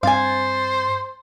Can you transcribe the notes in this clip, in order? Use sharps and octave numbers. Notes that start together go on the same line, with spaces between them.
G2 C4 C5 F5 G#5 A6